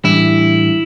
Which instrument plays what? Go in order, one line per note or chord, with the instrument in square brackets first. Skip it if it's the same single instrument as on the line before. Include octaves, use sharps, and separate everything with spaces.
[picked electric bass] A2 E3 G3 D4 [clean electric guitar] E4